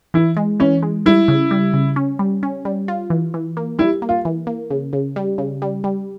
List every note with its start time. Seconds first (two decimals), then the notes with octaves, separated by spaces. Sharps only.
0.14 E3 E4
0.37 G#3
0.60 E3 C#4
0.83 G#3
1.06 G3 E4
1.28 C#3
1.51 G3
1.74 C#3
1.96 C#4
2.19 G3
2.43 C#4
2.65 G3
2.88 F4
3.10 E3
3.34 E3
3.57 A#3
3.79 G3 E4
4.02 A#3
4.09 F4
4.25 E3
4.47 A#3
4.70 C#3
4.93 C#3
5.16 G3
5.38 C#3
5.62 G3
5.84 G3